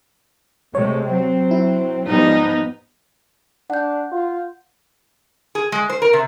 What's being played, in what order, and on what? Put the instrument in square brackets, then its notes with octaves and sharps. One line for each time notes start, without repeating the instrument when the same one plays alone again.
[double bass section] C3 G#3 A3 [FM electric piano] C#5
[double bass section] F#3 C4
[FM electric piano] E4
[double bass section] G#2 F3 G3 [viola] B3 D#4
[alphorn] D4 [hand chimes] F#5 G6
[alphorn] F4
[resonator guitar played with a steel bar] G#4
G#3
C5
A#4
C3